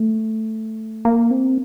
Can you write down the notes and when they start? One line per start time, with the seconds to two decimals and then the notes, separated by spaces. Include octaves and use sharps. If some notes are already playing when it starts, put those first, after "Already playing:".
Already playing: A3
1.05 A#3
1.31 C4